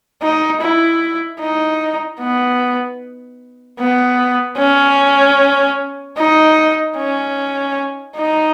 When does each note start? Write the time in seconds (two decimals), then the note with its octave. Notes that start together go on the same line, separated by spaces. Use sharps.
0.22 D#4
0.61 E4
1.40 D#4
2.20 B3
3.79 B3
4.58 C#4
6.17 D#4
6.97 C#4
8.17 D#4